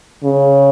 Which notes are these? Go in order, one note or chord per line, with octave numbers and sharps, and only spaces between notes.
C#3